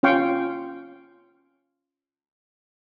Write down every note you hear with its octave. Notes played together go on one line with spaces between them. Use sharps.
C#4 F4 F5 G5 C#6